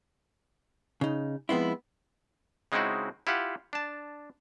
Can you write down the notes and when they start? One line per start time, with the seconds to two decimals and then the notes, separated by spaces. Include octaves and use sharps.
1.01 C#3 D#4
1.49 F3 G#3 B3 C4 E4
2.72 C#3 G#3 C4 D#4 E4 F#4
3.27 E4 F4 G4 F5 F#5
3.73 D4 A5